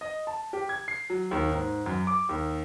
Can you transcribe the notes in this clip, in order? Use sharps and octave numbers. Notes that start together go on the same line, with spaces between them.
D#5
A5
G4
G#6
C7
F#3
D#2
G#2
F#2
D6
D#2